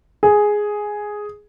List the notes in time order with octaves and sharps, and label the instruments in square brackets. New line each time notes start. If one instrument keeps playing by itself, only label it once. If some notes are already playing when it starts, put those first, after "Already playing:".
[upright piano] G#4